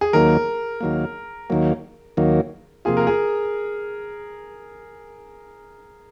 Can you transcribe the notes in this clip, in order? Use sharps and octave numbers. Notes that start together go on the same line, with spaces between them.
G#4
D#2 D#3 F#3 A#3 A#4
D#2 D#3 F#3 A#3
D#2 D#3 F#3 A#3
D#2 D#3 F#3 A#3
C3 F3 A#3 F4 G#4
A#4
G#4